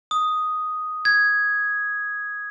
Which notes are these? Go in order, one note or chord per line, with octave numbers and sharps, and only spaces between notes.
D#6
G#6